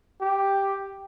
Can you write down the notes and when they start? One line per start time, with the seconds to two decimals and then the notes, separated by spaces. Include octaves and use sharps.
0.21 G4